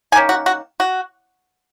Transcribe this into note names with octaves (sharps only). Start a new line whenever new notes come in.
D#3 A#3 C#4 G#5
F#4
F#4
F#4